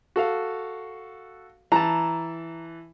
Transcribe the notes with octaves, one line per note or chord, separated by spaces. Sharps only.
F#4 A4 F5
E3 A5 A#5